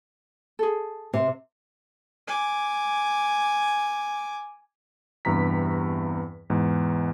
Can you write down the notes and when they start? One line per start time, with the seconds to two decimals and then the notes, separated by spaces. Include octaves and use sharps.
0.59 G#4 A4
1.13 C3
2.28 G#5 D6
5.25 E2 G2 C3 A#5 B6
6.50 E2 G#2